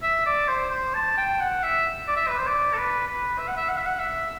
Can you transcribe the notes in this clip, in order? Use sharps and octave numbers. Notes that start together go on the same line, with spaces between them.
E5
D5
C5
C5
A5
G5
F#5
E5
D5
E5
B4
C5
D5
A4
B4
B4
E5
F#5
E5
F#5
E5
F#5
E5